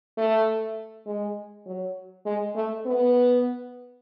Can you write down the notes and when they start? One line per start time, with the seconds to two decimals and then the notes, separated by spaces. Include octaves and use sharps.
0.17 A3
1.06 G#3
1.66 F#3
2.26 G#3
2.55 A3
2.85 B3